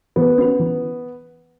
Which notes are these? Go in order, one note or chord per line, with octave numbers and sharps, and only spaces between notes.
E3 B3
C#4 F#4 B4
E3